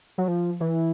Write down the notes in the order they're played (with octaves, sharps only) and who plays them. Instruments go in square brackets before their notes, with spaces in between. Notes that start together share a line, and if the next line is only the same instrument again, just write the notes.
[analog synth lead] F#3
F3
E3